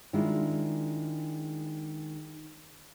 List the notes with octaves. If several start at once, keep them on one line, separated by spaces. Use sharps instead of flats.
D#3 G#3 D4 E4 F4